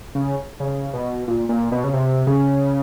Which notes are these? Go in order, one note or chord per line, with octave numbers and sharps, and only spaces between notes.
C#3
C#3
B2
A#2
A#2
B2
C#3
C3
C#3